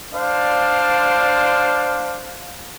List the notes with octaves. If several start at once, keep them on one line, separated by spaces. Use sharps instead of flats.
D4 C5 D5 F5